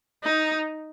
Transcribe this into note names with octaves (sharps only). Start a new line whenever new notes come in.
D#4